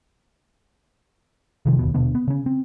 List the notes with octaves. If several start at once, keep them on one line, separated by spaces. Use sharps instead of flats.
F1 C3 D#3 F3
F#1 D#2 B2
D#1 B2 D3 B3
B3
C#3 C#4
C4